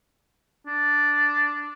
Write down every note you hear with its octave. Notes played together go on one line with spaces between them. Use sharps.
D4